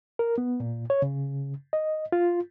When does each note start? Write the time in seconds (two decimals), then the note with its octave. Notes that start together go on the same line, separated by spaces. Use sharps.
0.19 A#4
0.38 B3
0.60 A#2
0.90 C#5
1.02 C#3
1.73 D#5
2.12 F4